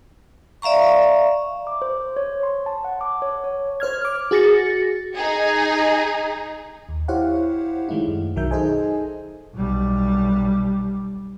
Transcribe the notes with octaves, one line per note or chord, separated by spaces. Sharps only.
D5 E5 F5 A#5 C#6
D6
C5
C#5
C6
A5
F#5
D6
C#5
C#5
C5 C#5 F6 G#6
D6 F6
F#4 G#4 A6 A#6 C#7
D#4 G#4
D#2
E4 G4 C5 C#5 F5 F#5
D#3 G#3 A3 D#4 E4
F#2
B1 D#3 F#3 A#4 E5 G6
D#4 G#4 A4 C5 D#5 G#5
B1 G3